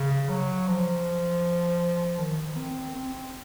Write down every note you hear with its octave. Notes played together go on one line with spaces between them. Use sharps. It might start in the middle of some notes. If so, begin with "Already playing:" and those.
Already playing: C#3
F#3
F3
D#3
C4
C4